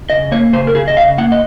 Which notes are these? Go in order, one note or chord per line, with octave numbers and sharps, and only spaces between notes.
C#3 D#5
A#3 C#5
C#3 C5
A#4
C#3 G#4
D#5
C#3 F5
A#3 F#5
D#5